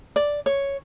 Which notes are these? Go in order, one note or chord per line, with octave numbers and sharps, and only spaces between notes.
D5
C#5